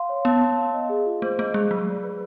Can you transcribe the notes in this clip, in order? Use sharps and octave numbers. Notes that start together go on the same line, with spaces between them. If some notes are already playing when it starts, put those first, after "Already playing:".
Already playing: F5 C6
C#5
B3 A5
C6
F5
D#5
G#4
F4
A3 C5
A3 D#5
G#3 G#4
F#3 B5
D5
B4